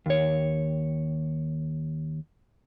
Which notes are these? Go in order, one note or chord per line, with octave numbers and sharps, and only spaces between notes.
D#2 C#5